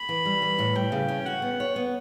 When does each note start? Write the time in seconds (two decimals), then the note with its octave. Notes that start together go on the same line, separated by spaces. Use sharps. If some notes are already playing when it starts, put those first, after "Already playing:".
Already playing: B5
0.09 E3
0.25 G3
0.42 E3
0.59 A2
0.76 G3 G5
0.92 C#3
1.08 C#4
1.26 F#4 F#5
1.42 B3
1.60 C#5
1.76 B3